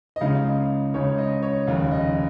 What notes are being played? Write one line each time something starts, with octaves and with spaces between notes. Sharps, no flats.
D#5
C#2 C#3 G#3 D#4 F5
C#2 C#3 G#3 D#4 C#5
D#5
C#5
F1 D#2 C#3 F5
D#5